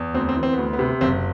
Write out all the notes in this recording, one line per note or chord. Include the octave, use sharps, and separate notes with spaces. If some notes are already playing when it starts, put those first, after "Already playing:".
Already playing: E2
D2 C4
C4
E3
C4
D2 B3
B3
C3
F#1 C4